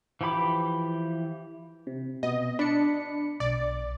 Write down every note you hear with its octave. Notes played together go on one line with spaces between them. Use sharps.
E3 F3 G4 B5 D6
C3
B2 B3 D#5
D4 B5 C#7
B1 D5